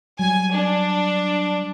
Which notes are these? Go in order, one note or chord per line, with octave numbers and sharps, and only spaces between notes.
F#3 G3 G#5
D4